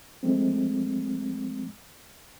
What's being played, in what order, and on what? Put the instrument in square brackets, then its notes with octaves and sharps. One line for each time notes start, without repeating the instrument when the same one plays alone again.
[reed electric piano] F3 G#3 A3 C4